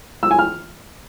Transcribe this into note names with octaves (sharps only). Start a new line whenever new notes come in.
E6
G#5
F6